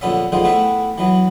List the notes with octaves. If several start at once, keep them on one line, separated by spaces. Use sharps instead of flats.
A#1 D3 B3 C#4 E5
D3 D#3 F3 G#3 B3 C4
A3 B3 E4 B4 E5 G5
E3 F#3 B3